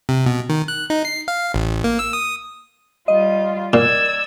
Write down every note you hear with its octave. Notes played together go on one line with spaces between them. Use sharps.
C3
B2
D#3
F#6
D#4
C7
F5
A1
A#3
E6
D#6
G3 F4 D#5
A#2 D5 E6 G#6